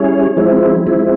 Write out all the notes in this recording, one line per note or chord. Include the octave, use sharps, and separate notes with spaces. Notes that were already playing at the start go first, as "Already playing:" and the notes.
Already playing: G3 C#4 E4 G#4 C#5
F3 G#3 C4 E4
F3 G#3 C4 E4